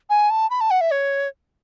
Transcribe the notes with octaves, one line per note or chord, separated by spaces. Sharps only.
G#5
A5
B5
A5
F#5
E5
C#5